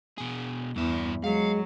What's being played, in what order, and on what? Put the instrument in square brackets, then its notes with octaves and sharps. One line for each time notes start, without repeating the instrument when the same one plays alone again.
[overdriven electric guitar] B2 G#4
[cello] E2 [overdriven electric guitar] G2 E5
[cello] F#3 [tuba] G#3 [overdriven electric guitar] F5